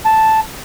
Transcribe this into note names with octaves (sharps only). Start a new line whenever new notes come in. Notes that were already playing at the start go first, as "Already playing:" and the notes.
A5